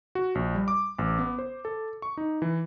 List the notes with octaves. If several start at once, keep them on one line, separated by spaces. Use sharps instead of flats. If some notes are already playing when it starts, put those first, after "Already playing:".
F#4
A#1
G3
D6
A1
B3
C5
A4
C#6
D#4
E3